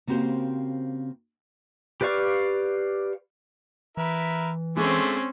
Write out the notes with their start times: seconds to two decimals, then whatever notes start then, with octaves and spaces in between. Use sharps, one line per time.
0.07 C#3 A#3 C4 F#4 G4 C5
2.01 G4 B4 D5 F5 C#6
3.97 E3 E4 A#4 B4
4.77 D3 G#3 A3 C4 C#4